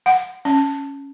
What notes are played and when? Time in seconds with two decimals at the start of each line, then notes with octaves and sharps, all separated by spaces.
0.06 F#5
0.45 C#4